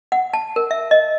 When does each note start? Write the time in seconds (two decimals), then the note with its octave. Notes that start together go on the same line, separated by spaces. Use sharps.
0.12 F#5
0.33 A5
0.56 A#4
0.71 E5
0.91 D#5